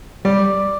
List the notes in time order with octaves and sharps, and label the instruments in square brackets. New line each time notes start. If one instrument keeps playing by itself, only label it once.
[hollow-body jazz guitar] G3 [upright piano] D5